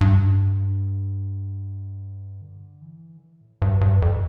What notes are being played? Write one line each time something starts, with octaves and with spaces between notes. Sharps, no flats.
G2
D3
E3
D3
E3
A2
G2
G2
F2